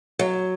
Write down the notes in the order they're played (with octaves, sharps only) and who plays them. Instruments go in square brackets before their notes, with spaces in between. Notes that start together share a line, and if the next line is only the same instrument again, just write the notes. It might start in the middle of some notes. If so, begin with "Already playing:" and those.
[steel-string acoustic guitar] F#3